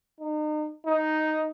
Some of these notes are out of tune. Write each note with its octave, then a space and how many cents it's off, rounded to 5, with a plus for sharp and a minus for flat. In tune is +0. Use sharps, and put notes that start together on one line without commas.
D#4 -35
D#4 +0